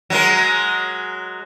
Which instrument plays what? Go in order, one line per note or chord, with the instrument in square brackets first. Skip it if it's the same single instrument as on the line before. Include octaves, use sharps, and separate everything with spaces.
[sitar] F#3 G#3 A#4